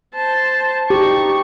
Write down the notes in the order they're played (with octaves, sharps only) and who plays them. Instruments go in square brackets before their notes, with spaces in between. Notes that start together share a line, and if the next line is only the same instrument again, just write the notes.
[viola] C5 A5
[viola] D#4 C#6 [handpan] G4